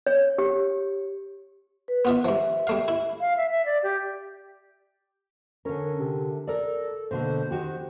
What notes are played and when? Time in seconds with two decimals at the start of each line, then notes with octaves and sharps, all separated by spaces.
0.07 C#5
0.38 G4
1.88 B4
2.05 B3 F4 E5
2.25 G2 F3 E5
2.67 G3 A3 F5
2.88 E4
3.20 F5
3.37 E5
3.50 E5
3.65 D5
3.83 G4
5.65 D3 C#4 A#4
5.99 C3
6.47 A4 A#4 D5
7.11 B2 D3 A#3 C5
7.51 D#3 F#4 G4